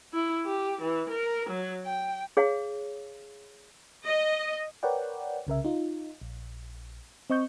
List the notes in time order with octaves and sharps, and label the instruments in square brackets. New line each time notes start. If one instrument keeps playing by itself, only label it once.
[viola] E4
G4
E3
A#4
F#3
G5
[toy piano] G#4 C#5 F5
[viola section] D#5
[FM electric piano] A#4 B4 C#5 D5 F#5 G5
C2 C#3 A#4 E5
D#4 F4
A#1
C4 D#5 C#6 G6